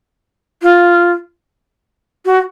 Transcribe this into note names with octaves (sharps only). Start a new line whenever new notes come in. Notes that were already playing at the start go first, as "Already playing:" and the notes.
F4
F#4